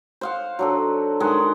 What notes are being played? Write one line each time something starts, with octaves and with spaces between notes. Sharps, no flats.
C5 F5 F#5
F#3 D4 A4
D#3 G#3 F#5 C6